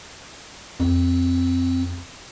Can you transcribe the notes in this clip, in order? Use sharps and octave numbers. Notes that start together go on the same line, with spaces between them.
F2 C4